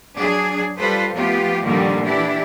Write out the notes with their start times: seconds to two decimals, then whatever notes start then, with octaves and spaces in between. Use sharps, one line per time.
0.17 F#3 D4 G#4
0.78 G3 F4 A4 B4 C5
1.14 F3 A3 B3 F4 G4
1.63 A#2 D3 D#3 F3 G3 A#3
2.04 E3 D4 E4 G4